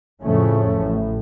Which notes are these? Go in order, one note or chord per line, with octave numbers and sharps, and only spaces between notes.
F2 A2 C#3 F3 A3 C#4
A1 A2